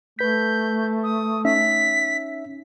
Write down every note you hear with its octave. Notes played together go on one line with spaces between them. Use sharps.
A3 B4 G6 B6
D#6
C#4 D#4 E5 B6